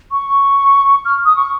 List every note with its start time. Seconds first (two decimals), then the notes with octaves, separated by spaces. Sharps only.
0.11 C#6
1.05 F6
1.25 D#6
1.36 C#6